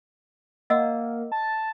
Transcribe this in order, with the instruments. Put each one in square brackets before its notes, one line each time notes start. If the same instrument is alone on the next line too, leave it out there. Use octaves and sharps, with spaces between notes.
[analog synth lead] A#3 [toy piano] D#5 F#5 E6
[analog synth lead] A5